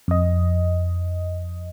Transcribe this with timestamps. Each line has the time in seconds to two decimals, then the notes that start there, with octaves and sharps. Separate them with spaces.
0.08 F2 D#5